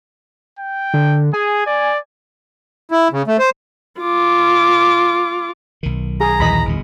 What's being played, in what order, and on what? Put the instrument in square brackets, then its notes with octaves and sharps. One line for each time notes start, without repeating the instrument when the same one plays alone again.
[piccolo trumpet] G5
[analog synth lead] D3
[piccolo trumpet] G#4 [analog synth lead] G#5
[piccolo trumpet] D5
[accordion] E4
C#3
A3
C5
[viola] F4 D6
[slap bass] B1 D#3
[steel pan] G#4 [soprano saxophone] A#5
[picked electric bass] D#1 E3 [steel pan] D#5 B5
[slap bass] G1 B2